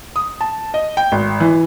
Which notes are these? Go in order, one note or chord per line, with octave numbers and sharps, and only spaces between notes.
D#6
A5
D#5
G5
G#1
E3